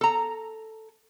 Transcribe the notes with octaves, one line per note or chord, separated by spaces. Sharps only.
A4 A#5